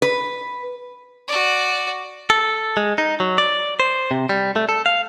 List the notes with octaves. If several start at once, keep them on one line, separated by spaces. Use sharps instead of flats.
B4
F#4 D5
A4
G#3
D#4
F#3
D5
C5
C3
G3
A3
A4
F5